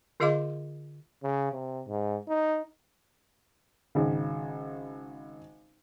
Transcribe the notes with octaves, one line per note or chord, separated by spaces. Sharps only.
D3 F4 G#4 D#5 F5 D6
C#3
C3
G#2
D#4
G#1 C#3